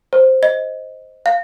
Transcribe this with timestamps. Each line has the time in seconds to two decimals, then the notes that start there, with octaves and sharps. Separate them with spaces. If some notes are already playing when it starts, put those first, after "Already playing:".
0.13 C5
0.43 D#5
1.26 F5